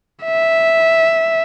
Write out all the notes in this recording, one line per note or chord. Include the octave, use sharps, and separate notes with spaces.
E5